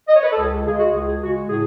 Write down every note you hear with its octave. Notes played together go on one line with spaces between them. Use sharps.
D#5
C#5
B4
A4
C#2 G#4
A4
C#3 G#3 G#4
F#4
C#2 G#4
G#4
C#3 G#3 F#4
F#4
A2 G#4